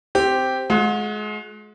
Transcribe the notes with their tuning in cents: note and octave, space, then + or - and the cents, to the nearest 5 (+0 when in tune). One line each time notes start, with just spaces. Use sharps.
C4 +0 G4 -5
G#3 +30 F#4 -40